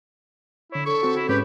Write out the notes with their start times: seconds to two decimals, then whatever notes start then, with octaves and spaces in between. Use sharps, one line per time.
0.72 D3 E4 C#5
0.86 A4 C#6
1.03 C4 F#4
1.16 E4
1.29 G#2 C#4 G4 B4 B5